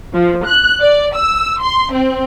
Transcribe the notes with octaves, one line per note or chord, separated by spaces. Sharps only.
F3
F#6
D5
E6
C6
C4